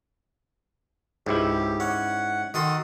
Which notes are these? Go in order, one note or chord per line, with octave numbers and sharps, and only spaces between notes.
C#2 G#2 E4 G4
C#4 F#5
D#3 F#4 A4 C6 D#6